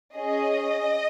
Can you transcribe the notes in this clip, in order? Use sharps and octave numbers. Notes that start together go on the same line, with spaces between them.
C#4 G#4 D#5